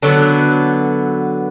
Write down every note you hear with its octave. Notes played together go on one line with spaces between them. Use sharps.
D3 F#3 B3